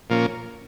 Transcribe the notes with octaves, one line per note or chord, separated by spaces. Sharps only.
A#2 F3 A#3 C#4